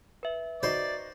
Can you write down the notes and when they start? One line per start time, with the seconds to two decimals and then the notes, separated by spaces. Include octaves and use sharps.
0.23 B4 E5
0.63 D#4 F#4 C5 D5